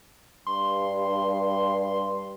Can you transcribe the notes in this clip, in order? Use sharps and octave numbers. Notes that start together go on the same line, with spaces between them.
G2 C6